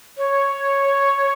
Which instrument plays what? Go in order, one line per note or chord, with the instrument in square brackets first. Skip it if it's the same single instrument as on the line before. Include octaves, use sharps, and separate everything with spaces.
[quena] C#5